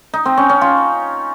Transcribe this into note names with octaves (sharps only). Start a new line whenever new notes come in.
D#4
C4
C#4
C#4
F4